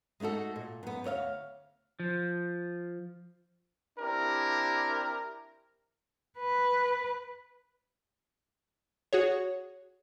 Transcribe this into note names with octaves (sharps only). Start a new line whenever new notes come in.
G#3 A3 D#4 F#4 A4
A#2
F#2 B3
D2 C#5 D#5 F5
F3
C4 D4 E4 G4 A#4
B4
F#4 G#4 C#5